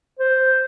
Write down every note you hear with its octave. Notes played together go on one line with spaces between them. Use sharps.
C5